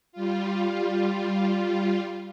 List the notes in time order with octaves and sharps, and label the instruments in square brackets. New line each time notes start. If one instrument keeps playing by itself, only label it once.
[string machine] G3 F4